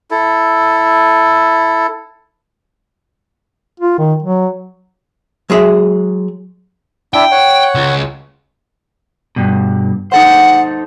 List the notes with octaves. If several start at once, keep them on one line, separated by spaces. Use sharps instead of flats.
E4 A4
F4
D#3
F#3
F#3 G#3 G#4 E5
D4 E4 E5 G5
C#5 F#5
C#2
G2 B2
D#4 A4 C5 F#5